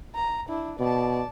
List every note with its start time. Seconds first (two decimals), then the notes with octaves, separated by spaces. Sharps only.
0.15 A#5
0.49 D4 E4
0.79 B2 D5 A5